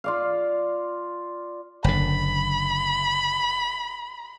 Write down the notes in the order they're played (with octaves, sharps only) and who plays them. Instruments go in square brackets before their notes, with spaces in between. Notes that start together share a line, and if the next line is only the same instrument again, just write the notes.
[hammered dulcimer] F4 D5 F5
[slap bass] F#1 D3 [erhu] B5